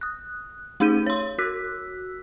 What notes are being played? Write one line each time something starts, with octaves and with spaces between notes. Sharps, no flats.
D#6 F#6
A3 D#4 G#4 G6 D#7
C#5 C6
F#4 E6 F#6 B6